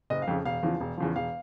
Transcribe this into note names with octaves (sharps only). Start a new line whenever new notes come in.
F#1 D#5
F5
F2 C#3
E1 F5
E2 C#3 F3
E1
E2 C#3 F3
E1 F5